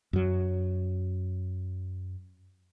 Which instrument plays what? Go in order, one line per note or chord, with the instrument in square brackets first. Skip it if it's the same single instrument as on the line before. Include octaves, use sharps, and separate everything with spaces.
[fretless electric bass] F#2 F#3